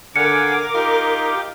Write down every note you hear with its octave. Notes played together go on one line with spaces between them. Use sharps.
D3 A#4 F5 F#5 G#5 D6 C#7
D#4 F4 G4